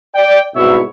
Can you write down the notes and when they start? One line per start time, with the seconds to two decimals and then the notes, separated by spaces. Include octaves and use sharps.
0.15 D5 G5
0.56 C2 G#2 B2 E4 C#5 E5